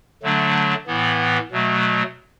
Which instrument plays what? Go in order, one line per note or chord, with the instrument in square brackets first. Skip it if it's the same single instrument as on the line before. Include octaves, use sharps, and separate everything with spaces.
[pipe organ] D3 F#3 A3 D4
A2 E3 B3
B2 F#3 A3